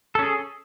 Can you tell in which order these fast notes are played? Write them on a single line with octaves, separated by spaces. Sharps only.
A4 C#4 G#4